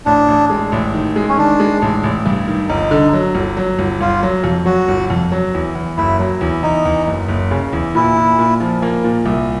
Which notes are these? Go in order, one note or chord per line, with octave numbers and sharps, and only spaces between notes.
A1 D4
A1
G#3
A1
D#3
G#3
C#4
D#3 D4
G#3
A1
A1
G2
D#3
G1 D#4
D3
F#3
G1
F#3
G1
G1 F4
F#3
F2
F#3 F#4
G1
F2
F#3
E2
E2
F#1 E4
F#3
E2
E2 D#4
E2
F#1
F#1
C#3
E2
A#2 E4
A#2
A#2
F3
A#3
A#2
C2